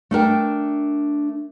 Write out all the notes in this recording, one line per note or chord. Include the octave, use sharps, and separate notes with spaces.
A3 D4 A#4 G5